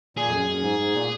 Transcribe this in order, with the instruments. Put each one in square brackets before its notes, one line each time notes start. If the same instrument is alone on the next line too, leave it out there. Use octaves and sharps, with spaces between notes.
[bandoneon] A#2 [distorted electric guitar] G#4
[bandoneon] F2
F#2
F#2
G#2
G#2
A#2